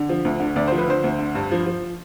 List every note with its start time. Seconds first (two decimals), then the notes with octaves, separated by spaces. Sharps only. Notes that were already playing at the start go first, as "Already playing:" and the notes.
Already playing: D3
0.09 F3
0.25 D2
0.40 D3
0.56 D2 D5
0.68 F3 C5
0.78 B4
0.87 D3 C5
1.04 D2
1.19 D3
1.35 G2
1.51 F3
1.66 F3